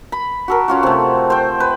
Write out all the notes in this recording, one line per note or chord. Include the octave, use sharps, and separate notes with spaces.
B5
F#4 A4 A#4
C#4 F4 F#4
C3 A3
C5 G5
B4